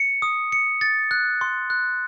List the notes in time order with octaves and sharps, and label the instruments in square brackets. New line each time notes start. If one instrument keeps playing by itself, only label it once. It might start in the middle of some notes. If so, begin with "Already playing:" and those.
Already playing: [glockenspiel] C#7
D#6
C#7
A6
F#6
C6
F#6